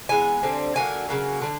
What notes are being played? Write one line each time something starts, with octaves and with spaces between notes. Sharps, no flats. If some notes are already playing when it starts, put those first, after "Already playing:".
E3 G#3 B3 G#5
D3 G3 C4
D3 F#3 A#3 G#5
C#3 F#3 A#3
D3 G3